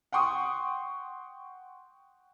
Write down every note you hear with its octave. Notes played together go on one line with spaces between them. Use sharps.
F#5 G5 C6 C#6 D#6